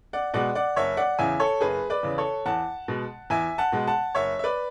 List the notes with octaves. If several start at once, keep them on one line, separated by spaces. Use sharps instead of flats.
D5 F#5
B2 G#3 D5 F#5
D5 F#5
F#1 C#5 E5
D5 F#5
E2 C#3 E5 G#5
A4 C#5
F#1 G#4 B4
B4 D5
E2 C#3
A4 C#5
E2 F#5 A5
B2 G#3
E2 E5 G#5
F#5 A5
B2 G#3
F#5 A5
F#1 C#5 E5
E5
B4 D5